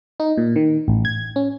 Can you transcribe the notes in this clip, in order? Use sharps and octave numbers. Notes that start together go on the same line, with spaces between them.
D#4
A#2
D#3
A1
G#6
C#4